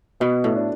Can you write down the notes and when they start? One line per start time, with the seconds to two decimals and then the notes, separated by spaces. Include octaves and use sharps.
0.20 B2 B3
0.44 A2
0.56 D4